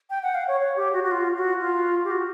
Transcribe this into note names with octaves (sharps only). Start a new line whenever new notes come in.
G5
F#5
F5
C#5
C#5
G4
F#4
F#4
F4
F#4
F4
G4
F#4